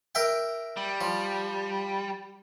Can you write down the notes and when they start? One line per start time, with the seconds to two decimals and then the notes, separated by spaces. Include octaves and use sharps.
0.15 A#4 E5 G5
0.77 G3
1.01 F3